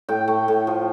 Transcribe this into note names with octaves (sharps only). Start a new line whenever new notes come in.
A2 G5
A3
A2
F3